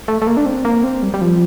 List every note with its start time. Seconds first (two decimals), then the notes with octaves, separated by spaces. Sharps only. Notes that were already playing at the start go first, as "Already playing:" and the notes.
0.08 A3
0.22 A3
0.27 A#3
0.37 D4
0.46 C4
0.65 A#3
0.84 C4
1.03 G3
1.14 G3
1.21 F3